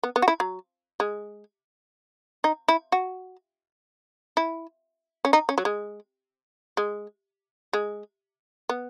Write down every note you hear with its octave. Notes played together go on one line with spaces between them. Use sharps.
B3
B3
F#4
E4
F#3
G#3
D#4
E4
F#4
E4
C#4
D#4
C#4
F#3
G#3
G#3
G#3
B3